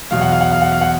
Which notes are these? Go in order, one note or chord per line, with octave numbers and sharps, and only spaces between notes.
E2 B2 F#3 F5
F#5
F5
F#5
F5
F#5
F5
F#5